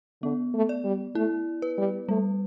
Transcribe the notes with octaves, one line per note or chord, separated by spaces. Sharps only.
D3 B3
A3
D5
G3
A3 E4
B4
G3
G3 A3